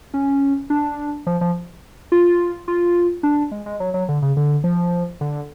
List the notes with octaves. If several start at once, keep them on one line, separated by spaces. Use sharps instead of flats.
C#4
D4
F3
F3
F4
F4
D4
G#3
G#3
F#3
F#3
D3
C#3
D3
F3
D3